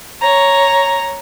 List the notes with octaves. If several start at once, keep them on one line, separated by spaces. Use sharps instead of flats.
C#5 A#5